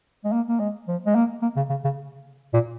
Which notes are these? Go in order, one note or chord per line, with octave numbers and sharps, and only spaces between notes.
G#3
A#3
A#3
G#3
F3
G#3
A#3
A#3
C#3
C#3
C#3
A#2